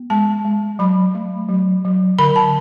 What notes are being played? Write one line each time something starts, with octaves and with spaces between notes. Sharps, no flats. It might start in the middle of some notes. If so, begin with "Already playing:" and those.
Already playing: B3
G#3 A5
G#3
F#3 B5
A3
F#3
F#3
D3 B5
A5